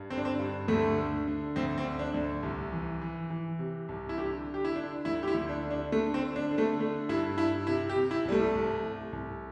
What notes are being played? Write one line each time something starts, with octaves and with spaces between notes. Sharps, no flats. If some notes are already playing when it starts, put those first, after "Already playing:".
Already playing: G2
D3 C4
D4
C4
G2
D2 A3
D3
D3
D2 C4
C4
D3
D4
D2
C2
E3
E3
E3
C3
C2
E4
D3 G4
D3
G4
E4
D3 D4
D2 E4
G4
E4
D2
D4
D3
D4
D3 A3
C4
D3
D4
D3
A3
D3 A3
G2 E4
G2 E4
C3 E4
G4
C3
E4
C2 G3
A3
C2
C2
C2